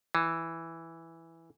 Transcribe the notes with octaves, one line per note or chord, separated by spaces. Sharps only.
E3